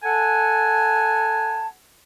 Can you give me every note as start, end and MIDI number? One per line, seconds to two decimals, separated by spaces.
0.04 1.67 69
0.04 1.67 78
0.04 1.67 80
0.04 1.67 81